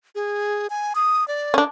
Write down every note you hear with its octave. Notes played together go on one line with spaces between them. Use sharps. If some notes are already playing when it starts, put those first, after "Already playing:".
G#4
G#5
D#6
D5
C#4 D4